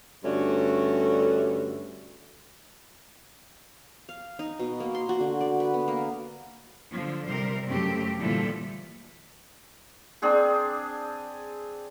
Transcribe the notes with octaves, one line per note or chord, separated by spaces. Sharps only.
G2 D3 A3 C#4 F#4
F5
D#4
B2
A#3
C6
F#4
D3
D5
B4
B3
A#3
D3 F3
C3 G3 A#4 C5
F#2 C#3 A3 C4 G4
A#2 D3 E3 F3 G3 A4
C4 D4 G#4 C5